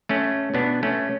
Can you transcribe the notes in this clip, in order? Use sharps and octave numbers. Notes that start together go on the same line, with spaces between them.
A3 C#4
B2 B3 D4
A3 C#4